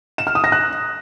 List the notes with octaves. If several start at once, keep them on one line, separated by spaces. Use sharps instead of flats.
E7
F6
D#6
A#6
F#6